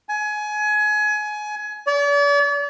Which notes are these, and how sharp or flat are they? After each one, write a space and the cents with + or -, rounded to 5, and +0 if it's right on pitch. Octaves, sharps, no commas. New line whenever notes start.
G#5 +25
D5 -40